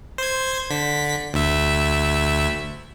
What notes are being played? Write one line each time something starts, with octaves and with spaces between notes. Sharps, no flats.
C5 G#6
D3 B6
D2 E5